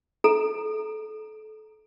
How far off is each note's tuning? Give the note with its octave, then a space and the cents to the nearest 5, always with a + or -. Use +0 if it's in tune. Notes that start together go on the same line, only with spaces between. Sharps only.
A4 -30 A#5 +0